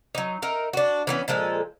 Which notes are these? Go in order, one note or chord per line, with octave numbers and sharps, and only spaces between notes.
F#3 D#4
D#4 A#4 E5
D4 F#4
E3 B3 C#4
A#2 F3 G#3 A4